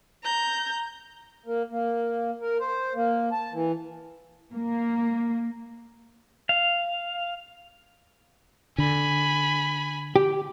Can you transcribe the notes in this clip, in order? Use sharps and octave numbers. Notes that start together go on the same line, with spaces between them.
A#5 G6
A#3
A#3
A#4
C5
A#3
A5
E3
A#3
F5
D3 G#5 B5
G4